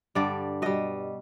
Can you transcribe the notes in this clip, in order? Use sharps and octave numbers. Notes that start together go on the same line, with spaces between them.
G2 D3 G3 D5
B2 G3 D#5